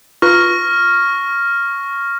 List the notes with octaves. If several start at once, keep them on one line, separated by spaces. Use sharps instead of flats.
F4 B4 A#5 C#6 F6 A#6